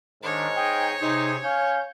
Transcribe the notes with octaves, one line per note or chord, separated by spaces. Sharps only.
G#2 D#3 D4 C#5
D#4 G#4 G5
C3 D#4 G#4 C5
C#4 F5 G6